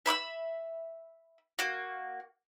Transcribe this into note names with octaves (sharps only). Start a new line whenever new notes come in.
E5 B5 D6 E6
A#3 F#4